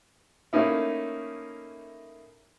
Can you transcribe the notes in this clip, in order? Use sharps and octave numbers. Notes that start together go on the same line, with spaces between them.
A3 A#3 C#4 D#4 E4